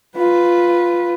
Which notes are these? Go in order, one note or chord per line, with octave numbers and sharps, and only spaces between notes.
F4 B4